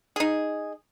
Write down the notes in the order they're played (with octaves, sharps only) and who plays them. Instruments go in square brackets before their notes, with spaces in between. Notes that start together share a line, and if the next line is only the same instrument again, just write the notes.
[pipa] D#4 G#4